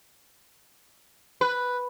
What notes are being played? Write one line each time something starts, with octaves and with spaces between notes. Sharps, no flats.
B4